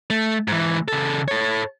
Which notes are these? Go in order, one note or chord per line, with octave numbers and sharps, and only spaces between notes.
A3
G#2 E3
C#3 A4
A4 C#5